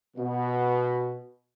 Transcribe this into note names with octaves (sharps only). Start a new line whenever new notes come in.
B2